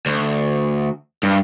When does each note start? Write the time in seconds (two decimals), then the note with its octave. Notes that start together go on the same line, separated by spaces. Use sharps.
0.06 D2
1.23 G2